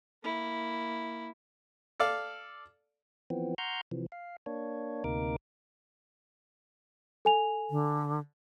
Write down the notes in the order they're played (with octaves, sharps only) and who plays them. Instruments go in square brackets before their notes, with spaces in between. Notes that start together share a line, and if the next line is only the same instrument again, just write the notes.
[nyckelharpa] A#3 E4
[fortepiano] A4 D5 F5
[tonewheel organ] E3 F3 B3 C4
F#5 A#5 C6 C#6 F6 G6
C3 E3 F3
F5
A#3 D4 C#5
D2 C3 A#3 D#4 A#4 D6
[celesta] A4 G#5 F7
[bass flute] D3